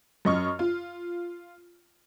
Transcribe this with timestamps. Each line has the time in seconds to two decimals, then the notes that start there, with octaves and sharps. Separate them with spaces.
0.25 F#2 D#5 C#6 F6
0.59 F4